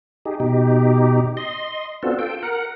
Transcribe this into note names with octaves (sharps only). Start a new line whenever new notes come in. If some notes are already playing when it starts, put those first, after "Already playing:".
D#4 G4 G#4
B2 D#4 G4
D#5 C6
B3 C4 D4 F4 F#4 A4
F4 A4 G5
A#4 F#5